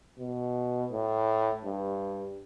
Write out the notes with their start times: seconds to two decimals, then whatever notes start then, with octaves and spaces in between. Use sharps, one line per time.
0.18 B2
0.91 A2
1.65 G2